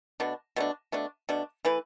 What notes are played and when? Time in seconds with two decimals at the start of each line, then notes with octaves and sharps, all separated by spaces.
0.20 B2 A3 D4
0.56 B2 A3 D4
0.92 B2 A3 D4
1.29 B2 A3 D4
1.65 E3 A3 E4 B4